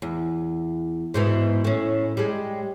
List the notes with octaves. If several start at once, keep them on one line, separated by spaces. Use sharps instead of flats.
E2
G#2 B2 E3
A2 C#4
G3 G#3